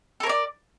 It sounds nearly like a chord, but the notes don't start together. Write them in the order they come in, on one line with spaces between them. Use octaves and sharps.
A4 A#4 C#5 D5